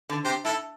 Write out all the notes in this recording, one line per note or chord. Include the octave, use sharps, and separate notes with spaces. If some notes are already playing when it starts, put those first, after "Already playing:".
D3
C3 G4 C5
A2 E4 A4